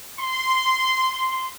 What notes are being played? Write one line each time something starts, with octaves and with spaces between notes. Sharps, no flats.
C6